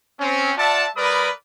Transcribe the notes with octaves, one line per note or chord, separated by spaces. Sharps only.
C4 C#4
F4 D5 E5 F#5 A5
G3 A#4 B4 D5 B5 D#6